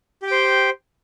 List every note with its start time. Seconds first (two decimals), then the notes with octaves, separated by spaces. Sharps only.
0.22 G4
0.27 G5
0.31 C5